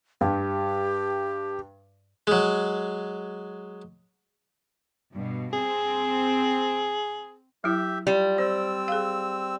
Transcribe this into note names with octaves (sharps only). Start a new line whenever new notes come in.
G2 G4
F#3 G#3
G2 B2
C4 G#4
F#3 E4 G4 E5
G3 F4
C4 C5 E6
G#4 F5